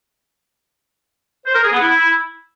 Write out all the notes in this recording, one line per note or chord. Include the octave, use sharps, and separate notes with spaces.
C5
A#4
G#4
B3
E4